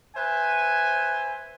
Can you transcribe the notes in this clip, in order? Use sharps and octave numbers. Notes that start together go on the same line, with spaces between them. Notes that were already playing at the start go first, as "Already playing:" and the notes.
B4 C5 E5 G#5